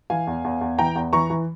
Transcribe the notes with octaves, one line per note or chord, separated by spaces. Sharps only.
E3 F5 G#5
E2
E2
E2
E3 G5 A#5
E2
E3 A#5 C#6
E3